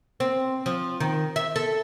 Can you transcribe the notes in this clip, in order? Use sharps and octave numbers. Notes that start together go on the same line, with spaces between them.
C4
F3
D#3
E5
A4